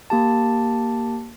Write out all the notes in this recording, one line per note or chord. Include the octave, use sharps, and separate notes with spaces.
A#3 G4 A5